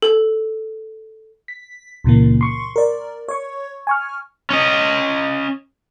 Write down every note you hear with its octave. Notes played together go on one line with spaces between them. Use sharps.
A4
B6
C#2 A#2 C#3 E3 A#3
C6 C#6
A#4 D5
C#5 C#6
G#5 C#6 F6
C#4 D#5